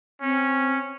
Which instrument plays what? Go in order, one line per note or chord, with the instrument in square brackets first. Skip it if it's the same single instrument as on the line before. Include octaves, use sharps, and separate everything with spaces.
[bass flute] C4 [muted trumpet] C#4